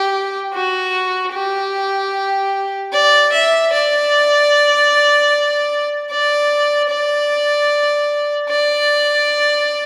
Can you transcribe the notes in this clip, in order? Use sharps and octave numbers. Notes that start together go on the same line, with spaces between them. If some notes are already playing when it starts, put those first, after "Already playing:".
Already playing: G4
F#4
G4
D5
E5
D5
D5
D5
D5